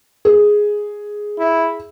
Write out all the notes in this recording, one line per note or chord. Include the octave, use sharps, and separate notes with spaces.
G#4
E4